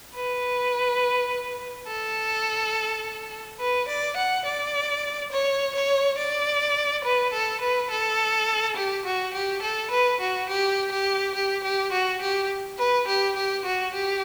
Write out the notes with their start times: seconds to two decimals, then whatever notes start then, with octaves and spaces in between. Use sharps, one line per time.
0.15 B4
1.87 A4
3.60 B4
3.88 D5
4.17 F#5
4.45 D5
5.32 C#5
5.75 C#5
6.18 D5
7.05 B4
7.33 A4
7.61 B4
7.90 A4
8.77 G4
9.06 F#4
9.34 G4
9.62 A4
9.91 B4
10.21 F#4
10.49 G4
10.92 G4
11.35 G4
11.64 G4
11.92 F#4
12.22 G4
12.78 B4
13.07 G4
13.36 G4
13.65 F#4
13.94 G4